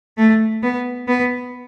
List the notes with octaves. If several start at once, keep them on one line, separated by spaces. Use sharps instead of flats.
A3
B3
B3